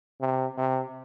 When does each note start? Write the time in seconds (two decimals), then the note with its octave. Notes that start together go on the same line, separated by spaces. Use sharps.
0.21 C3
0.57 C3